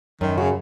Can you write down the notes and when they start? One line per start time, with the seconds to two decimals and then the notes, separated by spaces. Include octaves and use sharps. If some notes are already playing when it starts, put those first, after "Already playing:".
0.21 F#2 D#3
0.37 C#3 F#4